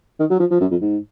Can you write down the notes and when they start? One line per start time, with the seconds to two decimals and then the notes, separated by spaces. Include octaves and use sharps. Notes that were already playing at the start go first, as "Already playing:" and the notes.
0.20 D#3
0.30 F#3
0.40 F3
0.51 F3
0.61 F#2
0.71 F2
0.82 G#2